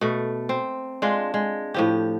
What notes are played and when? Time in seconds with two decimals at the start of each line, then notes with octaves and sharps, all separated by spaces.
0.01 B2 A3
0.49 C4
1.02 G#3 D4 F4
1.34 G#3
1.74 A2 F3 G4